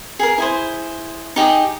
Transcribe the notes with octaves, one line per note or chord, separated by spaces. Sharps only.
G#4 A#4
E4 G#4 C5
D#4 G4 G#4 D#6